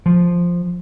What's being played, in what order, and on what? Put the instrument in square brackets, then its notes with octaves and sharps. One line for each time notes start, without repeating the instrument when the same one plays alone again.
[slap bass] F3